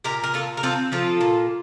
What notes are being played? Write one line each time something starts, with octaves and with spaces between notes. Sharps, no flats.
A#2 G4 A#4
A#4
A#2 F4 A4
A#4
C4 F4 A4
F3 F4 A4
A#2